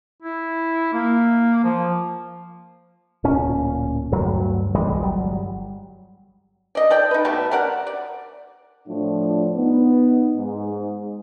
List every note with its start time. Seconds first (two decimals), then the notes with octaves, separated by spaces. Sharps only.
0.22 E4
0.93 A#3
1.64 F3
3.24 D1 A#2 C#4
4.12 D2 G2 F#3
4.75 C2 E3 G3 G#3
5.03 G1 F#3 G3
6.75 D5 D#5
6.90 A4 D5 G5
7.11 D#4 B4
7.25 B2 A3 G4
7.51 G4 A#4 D5 F#5
7.87 D5
8.88 A2 F3 D4
9.56 B3 D#4
10.37 G#2